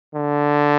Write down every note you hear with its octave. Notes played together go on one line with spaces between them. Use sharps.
D3